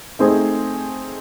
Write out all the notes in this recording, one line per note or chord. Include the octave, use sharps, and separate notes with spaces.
A3 C4 D#4 G#4 C5